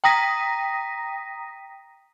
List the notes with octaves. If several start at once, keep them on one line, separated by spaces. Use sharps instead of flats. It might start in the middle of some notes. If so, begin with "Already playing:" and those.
G5 A#5 D#6 A#6 B6 D#7